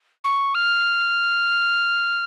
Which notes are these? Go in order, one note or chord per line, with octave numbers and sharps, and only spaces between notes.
C#6
F6